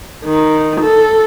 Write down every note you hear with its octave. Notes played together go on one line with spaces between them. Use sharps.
D#3
A4